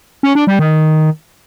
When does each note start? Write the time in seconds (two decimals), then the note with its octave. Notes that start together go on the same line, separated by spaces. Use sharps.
0.23 C#4
0.35 D4
0.47 G3
0.59 D#3